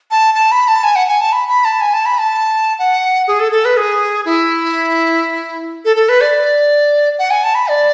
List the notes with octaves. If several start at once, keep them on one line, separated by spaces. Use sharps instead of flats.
A5
A5
B5
A5
G#5
F#5
G#5
A5
B5
B5
A5
G#5
A5
B5
A5
F#5
G#4
A4
A4
B4
G#4
E4
A4
A4
B4
D5
F#5
G#5
A5
B5
D5